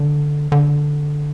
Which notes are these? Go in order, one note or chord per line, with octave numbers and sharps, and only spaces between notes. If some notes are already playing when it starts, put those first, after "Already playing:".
Already playing: D3
D3